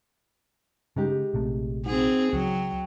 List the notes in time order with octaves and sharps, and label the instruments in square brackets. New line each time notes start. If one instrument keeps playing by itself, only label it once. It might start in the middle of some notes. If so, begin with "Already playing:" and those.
[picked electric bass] C#3 [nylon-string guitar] G#3 D#4 G4
[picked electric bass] A#1 C3 A3
[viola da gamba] C4 G#4 [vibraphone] D#4 [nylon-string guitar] F#4
[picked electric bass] C#2 [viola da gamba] F#3 [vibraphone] G5